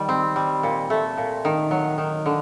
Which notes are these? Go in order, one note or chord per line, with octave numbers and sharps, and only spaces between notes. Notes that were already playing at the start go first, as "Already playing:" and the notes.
Already playing: D#3 G3
C4
G3
A#2
A3
A#2
D#3
F#3
D#3
D3